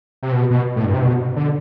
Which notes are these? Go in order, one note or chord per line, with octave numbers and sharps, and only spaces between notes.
C3
B2
B2
A2
G2
C3
B2
D3